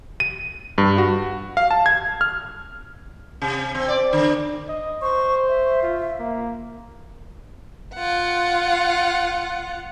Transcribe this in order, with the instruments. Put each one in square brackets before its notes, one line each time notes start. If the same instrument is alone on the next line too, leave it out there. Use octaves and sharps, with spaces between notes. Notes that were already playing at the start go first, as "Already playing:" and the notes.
[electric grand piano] D#7
G2
F#4
F5
A5
G#6
F6
[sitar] C3
C4
D5
D3
[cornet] D#5
[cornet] C5 [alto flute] C#6
[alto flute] E5
[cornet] F4
A#3
[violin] F4 F#5